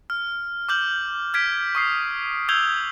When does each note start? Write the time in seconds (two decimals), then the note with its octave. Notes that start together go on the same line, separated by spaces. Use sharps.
0.10 F6
0.69 D6 F6 G6 F#7
1.34 F6 G#6 B6 D7
1.75 C#6 D#6 C7
2.49 D#6 E6 G6 G#6 F7 G7